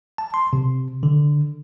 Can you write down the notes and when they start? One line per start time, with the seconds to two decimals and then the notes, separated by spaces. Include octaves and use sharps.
0.18 A5
0.34 C6
0.53 C3
1.03 D3